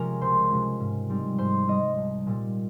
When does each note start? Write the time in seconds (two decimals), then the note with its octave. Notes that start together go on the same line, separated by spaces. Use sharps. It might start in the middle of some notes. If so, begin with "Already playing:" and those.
Already playing: C3 F3 G#3 C#4 G#4 A#4 G#5 A#5
0.21 C#2 C5 C6
0.50 C3 F3 G#3 C#4
0.80 G#2
1.10 G3 C4 D#4
1.38 G#2 C5 C6
1.68 G3 C4 D#4 D#5 D#6
1.97 C2
2.27 A#2 G3